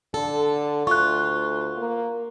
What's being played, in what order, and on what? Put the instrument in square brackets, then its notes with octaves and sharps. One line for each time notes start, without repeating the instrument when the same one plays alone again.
[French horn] D3 [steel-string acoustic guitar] A4
[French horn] D2 [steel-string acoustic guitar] F4 [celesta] C#6 F#6
[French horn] A#3